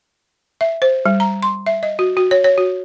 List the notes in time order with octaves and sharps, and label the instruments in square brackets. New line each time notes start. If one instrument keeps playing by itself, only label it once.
[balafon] E5
C5
G3
A#5
C6
E5
D#5
F#4
F#4
C#5
C#5
F#4